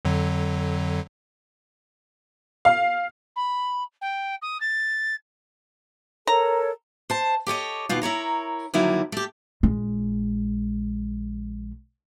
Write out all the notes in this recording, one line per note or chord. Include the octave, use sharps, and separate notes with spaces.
F2 D3 F#3
F5
B5
G5
D#6
A6
A4 A#4 C#5 A#5
C5 A5
G4 A4 C#5 D#5
D#2 B2 F4
E4 A#4 C#5 A#5
F2 D3 D#3 F#3 A#3 E4
A3 G4
A#1 G#3